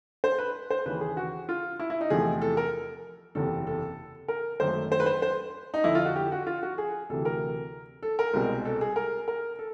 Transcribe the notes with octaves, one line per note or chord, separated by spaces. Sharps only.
C5
B4
C5
D#2 C#3 E3 B4
G#4
F#4
F4
E4
E4
D#4
E2 C3 F3 A3 C4 G#4
A4
A#4
F#1 E2 C3 A4
A4
A#4
G#1 F#2 D#3 F#3 A3 C5
C5
B4
C5
C5
D#4
F2 D3 F3 E4
F4
F#4
G4
F#4
F4
F#4
G#4
D2 C3 E3 A4
A#4
A4
A#4
C2 B2 G#3 C4
A4
G#4
A#4
A#4
A4